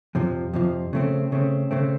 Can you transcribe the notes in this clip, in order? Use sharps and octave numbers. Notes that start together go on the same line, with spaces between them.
F2 C3 F3
F2 C3 F3
C#3 A3 C4
C#3 A3 C4
C#3 A3 C4